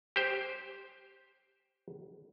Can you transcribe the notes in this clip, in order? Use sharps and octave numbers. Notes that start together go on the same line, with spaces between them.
G4 C5